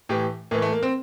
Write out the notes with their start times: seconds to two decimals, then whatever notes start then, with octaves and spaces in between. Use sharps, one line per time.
0.09 A2 E3 G4
0.51 A2 E3 A#3
0.62 A3
0.72 A#3
0.83 C4